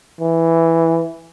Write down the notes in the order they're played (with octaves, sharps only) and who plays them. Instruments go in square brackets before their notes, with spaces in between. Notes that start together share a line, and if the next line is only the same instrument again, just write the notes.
[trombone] E3